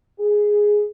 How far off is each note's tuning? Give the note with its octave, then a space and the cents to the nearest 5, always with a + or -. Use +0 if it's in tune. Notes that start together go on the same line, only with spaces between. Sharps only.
G#4 +0